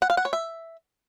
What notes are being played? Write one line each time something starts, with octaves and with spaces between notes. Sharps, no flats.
F#5
F5
F#5
C#5
E5